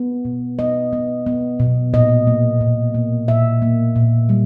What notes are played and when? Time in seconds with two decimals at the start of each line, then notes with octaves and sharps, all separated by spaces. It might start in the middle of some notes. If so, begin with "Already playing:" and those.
Already playing: B3
0.25 B2
0.59 B3 D#5
0.93 B3
1.26 B3
1.60 B2
1.93 A#2 D#5
2.27 A#3
2.61 A#2
2.94 A#3
3.28 A#2 E5
3.62 A#3
3.96 A#2
4.29 G3